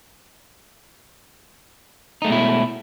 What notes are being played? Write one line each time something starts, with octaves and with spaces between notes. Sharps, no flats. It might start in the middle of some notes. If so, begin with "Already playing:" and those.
B2 G#3 A3 D#4 E4